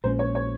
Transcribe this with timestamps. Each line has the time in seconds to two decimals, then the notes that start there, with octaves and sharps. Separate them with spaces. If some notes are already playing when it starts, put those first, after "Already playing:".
0.04 A#1 A#2 G#3 C#4 C5
0.19 C#5
0.35 C#5